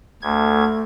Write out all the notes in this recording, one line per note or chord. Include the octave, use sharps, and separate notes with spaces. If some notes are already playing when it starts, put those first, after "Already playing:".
D2 A3 G#6